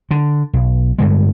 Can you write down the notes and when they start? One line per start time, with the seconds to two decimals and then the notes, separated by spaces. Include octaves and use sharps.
0.11 D3
0.53 B1
0.99 G2 D3 G#3